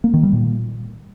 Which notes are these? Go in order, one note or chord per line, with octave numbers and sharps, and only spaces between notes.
A#3
D#3
G3
A#2